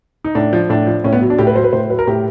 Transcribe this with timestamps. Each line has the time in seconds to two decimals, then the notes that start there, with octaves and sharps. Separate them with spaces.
0.24 D#4
0.35 A2 D4
0.53 F3
0.70 A2 D4
0.87 F3
1.04 A2 C#4
1.13 B3
1.22 F#3
1.30 D4
1.38 A2 G4
1.47 B4
1.55 F#3 C5
1.64 B4
1.73 A2 C5
1.90 F#3 B4
1.99 A#4
2.07 A2 G4